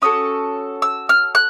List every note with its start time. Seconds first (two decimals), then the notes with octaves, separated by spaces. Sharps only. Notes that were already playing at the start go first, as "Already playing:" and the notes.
0.02 C#4 F#4 A4 D#6
0.82 E6
1.09 F6
1.35 F#6